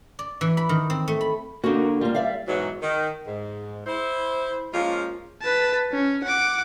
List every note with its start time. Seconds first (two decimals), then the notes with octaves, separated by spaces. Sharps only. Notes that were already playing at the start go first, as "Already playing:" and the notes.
0.19 D5
0.41 E3
0.57 B5
0.69 D#3
0.90 C4
1.08 A3
1.21 B5
1.64 D3 A#3 D#4 F#4
2.01 G3 A#3 F4
2.15 D5 E5 F5
2.47 G#2 B2 E3 F#3
2.82 D#3
3.27 G#2
3.86 E4 C5
4.73 F3 G#3 A#3 C#4 F4
5.42 B4 A5
5.93 C#4
6.24 F#5 D6